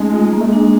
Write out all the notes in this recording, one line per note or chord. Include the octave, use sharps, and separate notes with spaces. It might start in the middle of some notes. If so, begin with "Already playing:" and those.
Already playing: G#3 A3 C#4 D#4
F4
G#3 A#3
A3
G#3
D4